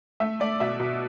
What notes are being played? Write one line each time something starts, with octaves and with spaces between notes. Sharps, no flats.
A3 E5
A3 D5
B2 E5
B2